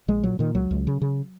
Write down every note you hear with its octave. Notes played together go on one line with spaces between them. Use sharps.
A#1 G#3
A#2 F#3
A#2 D#3
C#2 F#3
C#2
C#3
C#3